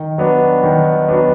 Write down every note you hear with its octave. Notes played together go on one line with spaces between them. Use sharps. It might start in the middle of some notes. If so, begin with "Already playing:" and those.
Already playing: D#3
F#3 B3 D4
D#3
F#3 B3 D4